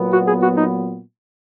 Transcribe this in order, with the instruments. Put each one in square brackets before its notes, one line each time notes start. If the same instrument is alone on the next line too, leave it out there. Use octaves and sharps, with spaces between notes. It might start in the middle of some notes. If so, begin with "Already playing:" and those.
Already playing: [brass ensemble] A#2 F#3 B3
[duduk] F#4
G#4
F#4
D#4